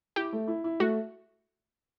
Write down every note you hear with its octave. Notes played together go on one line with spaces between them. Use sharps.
E4 G4
A3
E4
E4
A3 F#4